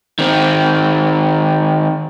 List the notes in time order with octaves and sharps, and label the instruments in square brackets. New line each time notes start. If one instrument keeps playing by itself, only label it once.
[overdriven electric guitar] D#3 C4